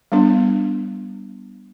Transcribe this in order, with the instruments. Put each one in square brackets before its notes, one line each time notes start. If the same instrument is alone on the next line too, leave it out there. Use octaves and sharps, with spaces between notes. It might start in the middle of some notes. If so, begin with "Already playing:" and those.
[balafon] G3 B3 D4